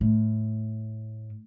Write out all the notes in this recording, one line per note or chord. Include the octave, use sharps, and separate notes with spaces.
A2